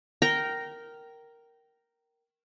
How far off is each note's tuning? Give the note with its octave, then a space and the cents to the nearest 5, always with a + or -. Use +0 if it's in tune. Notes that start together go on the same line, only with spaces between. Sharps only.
A#4 +0 G5 -20 A#5 +0